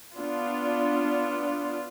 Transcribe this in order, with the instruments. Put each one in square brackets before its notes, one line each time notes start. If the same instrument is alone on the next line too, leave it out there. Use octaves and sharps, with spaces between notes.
[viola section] B3 D4 F4